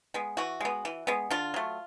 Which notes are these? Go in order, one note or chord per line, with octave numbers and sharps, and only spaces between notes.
G#3 B3
E3 F#4
G#3 B3
E3
G#3 B3
D3 F4
F#3 A3